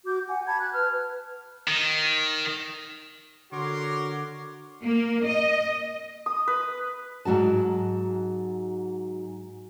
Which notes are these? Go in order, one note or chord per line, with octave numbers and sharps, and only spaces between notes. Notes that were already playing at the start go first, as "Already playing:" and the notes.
F#4 D6 G6
F#5 G#5
A5 B5 G#6
F#6
B4 F6
D#3
D3 F#4 A#4 C#5 C6 D6
A#3
D#5
D#6
B4
G#2 F#3 F#4 A5